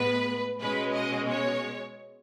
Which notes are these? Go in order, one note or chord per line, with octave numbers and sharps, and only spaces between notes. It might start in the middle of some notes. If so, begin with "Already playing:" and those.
Already playing: A2 G#3 B3 B4
B2 G#3 C#4 B4
D#5
C#5